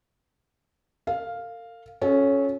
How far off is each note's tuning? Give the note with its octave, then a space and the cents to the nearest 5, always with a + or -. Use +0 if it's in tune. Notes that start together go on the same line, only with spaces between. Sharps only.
A#4 -45 F5 +0
C#4 +0 F#4 -40 A4 -30